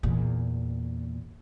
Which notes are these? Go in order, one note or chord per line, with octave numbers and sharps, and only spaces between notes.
E2 A#2